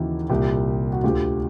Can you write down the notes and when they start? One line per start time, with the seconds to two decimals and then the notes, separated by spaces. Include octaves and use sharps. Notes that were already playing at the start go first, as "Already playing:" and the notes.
Already playing: D#2 C#3 E3 E4 F#4
0.30 C2 A#2 F4 G4
0.92 F#4
1.03 D2 D3 F4 G4